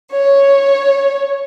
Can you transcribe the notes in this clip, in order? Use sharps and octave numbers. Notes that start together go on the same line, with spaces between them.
C#5